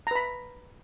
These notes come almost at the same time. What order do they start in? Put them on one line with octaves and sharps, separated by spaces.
A#5 B4 B5